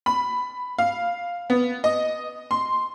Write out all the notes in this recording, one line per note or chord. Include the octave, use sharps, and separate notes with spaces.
B5
F5
B3
D#5
C6